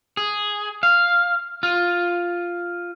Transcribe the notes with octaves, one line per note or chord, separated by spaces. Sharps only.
G#4
F5
F4